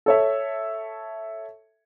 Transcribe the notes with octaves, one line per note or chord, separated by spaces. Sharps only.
A4 C#5 E5